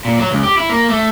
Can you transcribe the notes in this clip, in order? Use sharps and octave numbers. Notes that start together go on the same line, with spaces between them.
A#2
F#3
C#2
G4
E4
A#3
A3